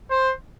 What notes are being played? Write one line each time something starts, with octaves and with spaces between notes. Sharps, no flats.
C5